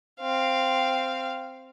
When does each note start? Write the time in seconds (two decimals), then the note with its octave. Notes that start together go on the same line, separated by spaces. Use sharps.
0.20 C4 F5